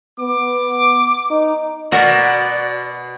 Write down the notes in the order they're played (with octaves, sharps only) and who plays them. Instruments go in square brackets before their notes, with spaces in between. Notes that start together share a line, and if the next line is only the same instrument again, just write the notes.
[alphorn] B3 [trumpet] D6
[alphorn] D#4
[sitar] B2 [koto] F#4 A#4 [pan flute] D5